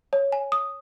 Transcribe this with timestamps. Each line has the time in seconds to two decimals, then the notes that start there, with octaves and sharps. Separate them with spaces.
0.13 C#5
0.32 G#5
0.52 D#6